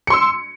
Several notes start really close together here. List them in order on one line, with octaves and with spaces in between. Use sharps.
C#7 C6 E6